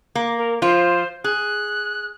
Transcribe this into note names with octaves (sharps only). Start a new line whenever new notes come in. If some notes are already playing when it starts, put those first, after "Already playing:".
A#3
A#4
F3 F4 C5
G#4 F#6